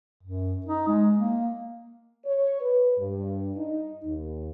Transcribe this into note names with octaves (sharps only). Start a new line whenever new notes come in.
F#2
D#4
G#3
A#3
C#5
B4
G2
D#4
D#2